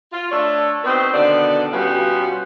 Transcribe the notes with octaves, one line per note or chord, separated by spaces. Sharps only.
F4
A3 D4 A4 C#5 D5
B3 C4 D#4 F#4 B4 C5
B2 D3 D#3 B3 D5
B2 G3 B3 C#4 F4 F#4